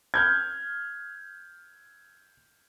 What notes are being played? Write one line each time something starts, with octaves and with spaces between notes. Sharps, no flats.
F6 G6 G#6